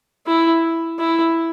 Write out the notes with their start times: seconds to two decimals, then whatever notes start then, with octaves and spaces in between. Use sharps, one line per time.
0.27 E4
0.99 E4